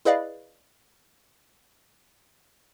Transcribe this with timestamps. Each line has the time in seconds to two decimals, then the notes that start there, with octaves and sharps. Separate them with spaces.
0.05 E4 G#4 B4 D5 D#5 F5